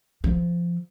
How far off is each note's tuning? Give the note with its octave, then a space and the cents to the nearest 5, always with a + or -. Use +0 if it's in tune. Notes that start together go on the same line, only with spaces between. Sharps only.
F3 -15